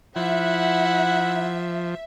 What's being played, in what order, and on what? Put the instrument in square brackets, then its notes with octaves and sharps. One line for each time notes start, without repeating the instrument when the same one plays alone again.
[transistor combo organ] F3 [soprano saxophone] E4 [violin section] E5 [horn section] F#5